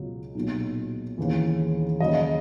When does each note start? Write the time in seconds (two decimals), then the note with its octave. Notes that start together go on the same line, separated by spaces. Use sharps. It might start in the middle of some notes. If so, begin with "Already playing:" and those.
Already playing: C#2 B2 F#3
0.35 B1 A#2 F#3
1.18 D#2 C#3 E3
2.00 D#2 C#3 F#3 D#5
2.15 D#5